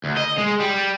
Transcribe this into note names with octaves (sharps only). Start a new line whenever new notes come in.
D2
D#5
G#3
G3